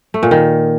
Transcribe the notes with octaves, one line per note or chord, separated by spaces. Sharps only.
A3
A#2
D#3